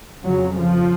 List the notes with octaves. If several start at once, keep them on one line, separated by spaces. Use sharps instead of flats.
F2 C#3 F#3
F3